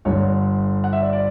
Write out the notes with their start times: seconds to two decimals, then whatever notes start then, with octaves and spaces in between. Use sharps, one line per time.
0.05 G1 G2 D3 C#5
0.84 F#5
0.93 E5
1.02 D5
1.13 D5